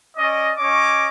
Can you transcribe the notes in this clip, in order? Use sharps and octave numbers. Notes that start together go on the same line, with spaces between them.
C#4 D5 D#5
C#4 C#5 D#5 D6